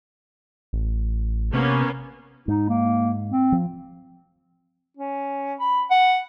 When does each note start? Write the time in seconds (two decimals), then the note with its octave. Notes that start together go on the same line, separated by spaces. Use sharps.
0.73 A1
1.54 C3 A#3 B3 C#4
2.48 G#2 D#4
2.68 A#3
3.31 C4
3.52 F3
4.97 C#4
5.60 B5
5.91 F#5